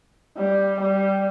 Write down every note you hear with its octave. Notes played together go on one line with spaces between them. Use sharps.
G3
G3